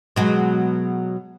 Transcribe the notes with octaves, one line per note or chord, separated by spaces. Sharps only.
B2 F#3 G#3